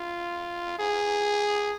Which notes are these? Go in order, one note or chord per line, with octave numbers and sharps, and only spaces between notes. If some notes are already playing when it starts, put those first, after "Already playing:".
Already playing: F4
G#4